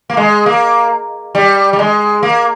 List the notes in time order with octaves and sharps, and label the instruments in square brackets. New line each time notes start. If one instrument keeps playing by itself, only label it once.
[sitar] A#3
G#3
A#3
G3
G3
G#3
A#3